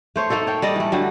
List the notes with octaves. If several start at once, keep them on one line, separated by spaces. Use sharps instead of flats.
A3 C5 C#5
A3 A#3 D#4 A4
C#5 G5
G3 D5 D#5
E3 A3
D3 F#3 G3